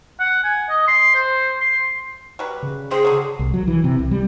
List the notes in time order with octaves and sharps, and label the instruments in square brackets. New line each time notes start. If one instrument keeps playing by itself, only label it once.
[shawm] F#5
G#5
D#5
C6
C5
C6
[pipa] F#3 G3 B4
[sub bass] C#3
[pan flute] G#4 [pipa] C5 G5
[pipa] D3 F#3
[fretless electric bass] C2
F#3
E3
C3
C2
G3